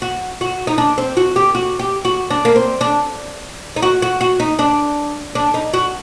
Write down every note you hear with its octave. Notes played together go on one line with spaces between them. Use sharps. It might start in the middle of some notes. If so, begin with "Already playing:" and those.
F#4
F#4
D#4
D4
C4
F#4
G4
F#4
G4
F#4
D4
A#3
C4
D4
D#4
F#4
F#4
F#4
D#4
D4
D4
D#4
F#4